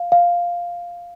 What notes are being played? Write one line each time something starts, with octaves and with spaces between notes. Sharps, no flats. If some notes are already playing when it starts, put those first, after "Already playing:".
Already playing: F5
F5